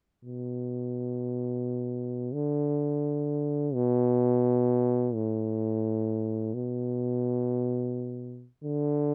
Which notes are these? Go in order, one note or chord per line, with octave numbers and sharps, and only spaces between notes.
B2
D3
B2
A2
B2
D3